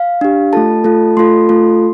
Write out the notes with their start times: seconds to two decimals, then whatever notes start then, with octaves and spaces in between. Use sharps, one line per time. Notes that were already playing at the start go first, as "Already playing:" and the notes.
Already playing: F5
0.21 D4 G4
0.53 A3 F4 A4 A5
0.84 A3 F4 A4
1.17 A3 F4 A4 C6
1.49 A3 F4 A4